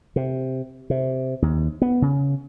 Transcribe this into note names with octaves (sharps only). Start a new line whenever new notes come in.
C3
C3
D#2
B3
C#3